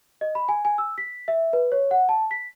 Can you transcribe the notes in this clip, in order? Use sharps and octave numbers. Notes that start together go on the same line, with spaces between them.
D#5
B5
G#5
G#5
E6
B6
E5
B4
C#5
F#5
A5
B6